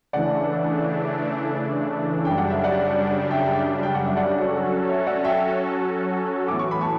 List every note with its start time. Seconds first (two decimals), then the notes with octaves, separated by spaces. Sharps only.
0.13 C#3 E3 A3 D4 D5 F#5
2.25 F#2 C#3 G3 D4 G5
2.38 F#5
2.50 E5
2.64 D5 F#5
3.31 E5 G5
3.83 G5
3.95 F#5
4.06 E5
4.17 D5 F#5
4.36 F#3 C#4 F#4 A4
4.89 C#5 E5
5.07 D5 F#5
5.25 E5 G5
6.48 A2 E3 B3 D6
6.59 C#6
6.71 B5
6.81 A5 C#6